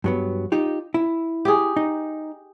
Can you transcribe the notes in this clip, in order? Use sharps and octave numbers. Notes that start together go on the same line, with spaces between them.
G2 F#3 B3
D#4 F4 G4
E4
G4 G#4
D#4